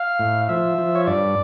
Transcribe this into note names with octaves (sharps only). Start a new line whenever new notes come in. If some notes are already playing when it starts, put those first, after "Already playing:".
Already playing: F5
A2
F3 E5
F3
C#5
G2 D5